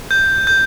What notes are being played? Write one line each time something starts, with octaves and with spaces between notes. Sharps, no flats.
G6
G6